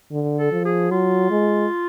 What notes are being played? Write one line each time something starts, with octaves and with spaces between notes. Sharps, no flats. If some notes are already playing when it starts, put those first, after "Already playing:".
D3
A4
F3
G#4
F#3 F4
G#3